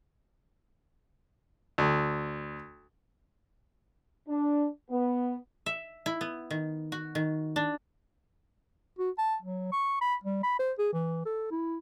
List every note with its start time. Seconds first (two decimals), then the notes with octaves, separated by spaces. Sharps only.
1.78 D2
4.28 D4
4.90 B3
5.66 E5
6.06 E4
6.21 B3
6.51 D#3
6.92 F#4
7.15 D#3
7.56 D4
8.99 F#4
9.18 A5
9.42 F#3
9.72 C#6
10.01 B5
10.24 G3
10.43 B5
10.59 C5
10.78 G#4
10.93 E3
11.26 A4
11.51 E4